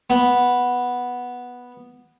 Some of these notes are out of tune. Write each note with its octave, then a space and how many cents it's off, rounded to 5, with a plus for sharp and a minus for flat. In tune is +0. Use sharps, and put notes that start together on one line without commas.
B3 -5